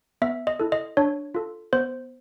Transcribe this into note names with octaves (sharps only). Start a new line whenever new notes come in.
B3 E5
D#5
E4 A4
D#5
D4 C#5
F4 A4
B3 C5